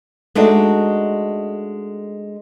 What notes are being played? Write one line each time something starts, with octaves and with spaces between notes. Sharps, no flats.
G#3 A3 D4 D#4 F#4